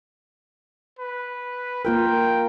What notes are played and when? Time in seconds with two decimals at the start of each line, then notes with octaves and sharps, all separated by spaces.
0.99 B4
1.85 A#3 F4 A#4 G5